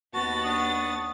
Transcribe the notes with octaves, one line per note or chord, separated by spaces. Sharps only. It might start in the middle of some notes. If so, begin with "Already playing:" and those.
D#2 B3 F#4 A5 A6
D4 C#6 D#6